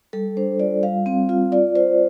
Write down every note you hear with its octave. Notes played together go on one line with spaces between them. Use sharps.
G3 A4
D4 C5
F4 D5
G3 F5
C4
F4
F4 D5
F4 C5